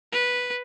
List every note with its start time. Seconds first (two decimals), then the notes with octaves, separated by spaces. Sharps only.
0.12 B4